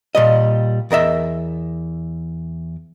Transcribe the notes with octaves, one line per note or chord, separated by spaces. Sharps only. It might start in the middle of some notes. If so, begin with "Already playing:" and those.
A#2 G3 D#5
E2 A#4 D#5 E5